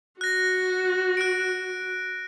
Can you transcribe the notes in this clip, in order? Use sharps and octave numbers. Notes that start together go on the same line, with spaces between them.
F#4 F#6 A#6
F#6 D7